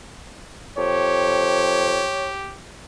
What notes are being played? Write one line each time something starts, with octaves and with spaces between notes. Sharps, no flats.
F2 G4 C#5